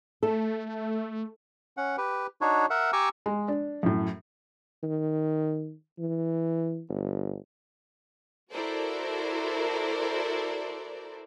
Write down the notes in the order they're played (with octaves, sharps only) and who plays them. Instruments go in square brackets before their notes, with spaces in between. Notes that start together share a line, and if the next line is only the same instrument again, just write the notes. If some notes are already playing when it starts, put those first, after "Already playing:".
[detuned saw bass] A3 [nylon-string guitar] A4
[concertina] C#4 F#5
G4 B4
D4 D#4 F#4 C#5
A#4 E5 F#5
G4 G#5 A#5 C#6 D6 E6
[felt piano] G#3
D4
F#2 A2
[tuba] D#3
E3
G1
[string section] E4 F#4 A4 A#4 C5 D5